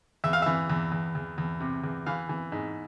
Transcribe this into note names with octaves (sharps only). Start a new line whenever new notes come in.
E2 E5
F5
E3 E5
E2
E2
E2
E2
C3
E2
E3 F5
E3
G#2